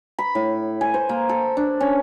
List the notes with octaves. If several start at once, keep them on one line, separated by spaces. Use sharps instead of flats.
B5
A2
G#5
C5
A#3
A4
D4
C#4